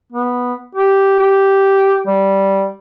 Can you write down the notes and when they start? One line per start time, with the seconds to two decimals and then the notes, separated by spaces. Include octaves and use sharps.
0.12 B3
0.75 G4
1.19 G4
2.07 G3